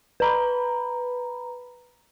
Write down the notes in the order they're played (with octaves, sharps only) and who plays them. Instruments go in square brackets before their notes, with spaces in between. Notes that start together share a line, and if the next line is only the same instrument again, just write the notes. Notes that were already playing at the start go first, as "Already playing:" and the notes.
[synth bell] B4 A#5 B5